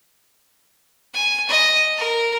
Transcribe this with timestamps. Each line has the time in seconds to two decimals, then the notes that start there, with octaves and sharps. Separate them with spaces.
1.14 G#5
1.49 D#5
1.97 A#4